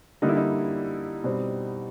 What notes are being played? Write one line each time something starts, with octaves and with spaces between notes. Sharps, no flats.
D3 G3 A#3 D#4
E4
D#4
B2 G3 C4